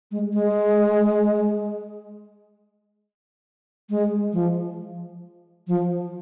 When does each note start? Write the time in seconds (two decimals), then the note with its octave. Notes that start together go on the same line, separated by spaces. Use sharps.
0.11 G#3
0.33 G#3
3.90 G#3
4.33 F3
5.68 F3